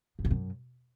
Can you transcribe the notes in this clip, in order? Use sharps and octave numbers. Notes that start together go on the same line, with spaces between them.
G#2
C3
F#2